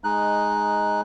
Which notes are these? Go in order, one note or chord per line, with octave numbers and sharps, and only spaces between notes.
G#3 D#4 F#6